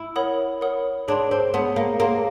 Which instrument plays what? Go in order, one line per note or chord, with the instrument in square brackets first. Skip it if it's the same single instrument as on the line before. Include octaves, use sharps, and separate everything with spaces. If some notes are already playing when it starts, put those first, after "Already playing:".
Already playing: [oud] E4
[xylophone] A#4 C#5 F#5 B5 D#6
A#4 C#5 F#5 B5 D#6
[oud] D4 [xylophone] G#4 C#5 F#5 A5 C6
[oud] C4
[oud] B3 [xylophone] G#4 C#5 F#5 A5 C6
[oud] A#3
[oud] A#3 [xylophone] G#4 C#5 F#5 A5 C6